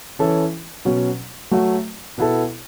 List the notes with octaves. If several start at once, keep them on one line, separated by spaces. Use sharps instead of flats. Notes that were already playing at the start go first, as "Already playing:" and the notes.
E3 C#4 E4 A4
B2 F#3 C#4
F#3 A3 F#4
B2 B3 E4 A4